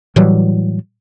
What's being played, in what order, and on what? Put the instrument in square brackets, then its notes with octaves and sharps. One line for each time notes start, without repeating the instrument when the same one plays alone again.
[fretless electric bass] A2 E3 F#3 G3